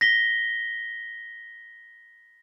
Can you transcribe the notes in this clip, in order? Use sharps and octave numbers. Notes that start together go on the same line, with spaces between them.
A#6 B6 G7